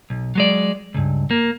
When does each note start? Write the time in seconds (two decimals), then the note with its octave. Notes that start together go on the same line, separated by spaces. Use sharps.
0.10 B1
0.35 F#3 G#3 D5
0.94 C#2 G2
1.31 A#3